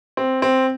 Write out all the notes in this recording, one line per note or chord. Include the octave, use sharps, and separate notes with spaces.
C4
C4